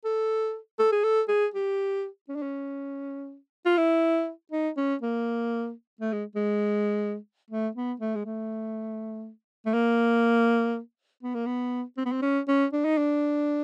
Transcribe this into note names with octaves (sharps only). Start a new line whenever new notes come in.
A4
A4
G#4
A4
G#4
G4
C#4
D4
C#4
F4
E4
D#4
C#4
A#3
A3
G#3
G#3
A3
B3
A3
G#3
A3
A3
A#3
B3
A#3
B3
C4
B3
C4
C#4
C#4
D4
D#4
D4